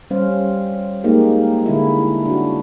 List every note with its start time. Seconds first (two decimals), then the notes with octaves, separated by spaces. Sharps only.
0.11 G3 C#4 C5 F5
1.04 G#3 A#3 D#4 G4
1.66 D3 G#3 A3 E4
2.26 D4 F#4